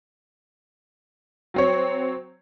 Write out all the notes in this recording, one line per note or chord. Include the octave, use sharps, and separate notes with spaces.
F#3 C4 C#5